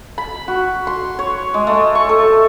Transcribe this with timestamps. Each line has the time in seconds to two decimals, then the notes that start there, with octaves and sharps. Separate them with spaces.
0.18 B5
0.48 F#4
0.87 C6
1.19 C#5
1.54 G#3
1.67 A3
1.95 C#6
2.09 A4